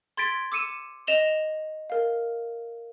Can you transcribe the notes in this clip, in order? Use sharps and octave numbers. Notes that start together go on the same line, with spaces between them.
C6 G#6 A6 B6 D7
D6 E6 C#7 D#7 E7
D#5 E7 F7 G7
A#4 F5